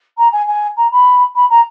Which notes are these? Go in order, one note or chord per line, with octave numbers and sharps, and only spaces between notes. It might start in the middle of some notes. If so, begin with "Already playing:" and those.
A#5
G#5
G#5
A#5
B5
B5
A#5